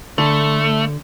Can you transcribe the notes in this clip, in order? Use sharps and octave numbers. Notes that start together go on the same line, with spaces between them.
D3 A3